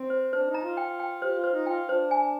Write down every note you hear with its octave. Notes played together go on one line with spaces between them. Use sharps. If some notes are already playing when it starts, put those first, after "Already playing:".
Already playing: C4
C5
D4 C5
D#4
A#5
F4
G5
G5
G4 C5
F4
C5
D#4
F4 G5
D4 C5
G#5